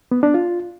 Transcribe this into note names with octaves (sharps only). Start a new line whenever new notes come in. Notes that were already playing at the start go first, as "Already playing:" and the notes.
B3
D4
F4